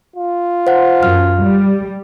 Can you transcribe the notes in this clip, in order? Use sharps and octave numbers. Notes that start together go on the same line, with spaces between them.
F4
C5 F#5
F#2 F6
G3